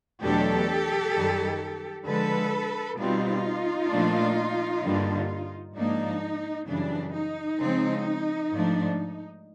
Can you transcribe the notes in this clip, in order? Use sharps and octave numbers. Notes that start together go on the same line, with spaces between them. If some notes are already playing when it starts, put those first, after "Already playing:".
E2 B2 F#3 A3 D4 G4 A4
F#2 D#3 G3
D3 F3 G#3 A4 B4
B2 G3 C4 D#4 F4
A#2 F3 A3 D4
G2 D3 G3 A#3 D4
G#2 F3 A#3 D4 D#4
F#2 C#3 E3 G3 D4
D#4
C#3 F3 G#3 C4
G#2 F3 A3 D4